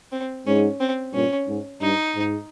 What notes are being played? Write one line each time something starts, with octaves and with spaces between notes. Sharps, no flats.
C4
G#2 C#4
C4
G2 A#2 C#4
G#2
G2 D#4
G#2